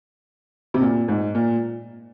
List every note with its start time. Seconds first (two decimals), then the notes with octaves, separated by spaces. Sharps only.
0.74 C3
0.81 A#2
1.08 G#2
1.35 A#2